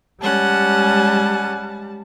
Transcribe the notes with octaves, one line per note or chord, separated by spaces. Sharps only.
G3 G#3 C#4 F#5 A5